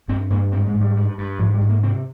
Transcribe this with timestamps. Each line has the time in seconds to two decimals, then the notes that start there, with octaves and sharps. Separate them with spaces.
0.08 G2 C4
0.30 G2 A#3
0.52 G#2 C4
0.67 G#3
0.74 G#2
0.81 G3
0.96 G2
1.18 G2
1.39 G#2 F3
1.54 G3
1.61 G#2
1.69 A#3
1.83 C3 C4